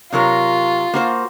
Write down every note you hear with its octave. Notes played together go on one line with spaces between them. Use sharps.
C3 F#3 F4 A#4
A#3 F#4 C5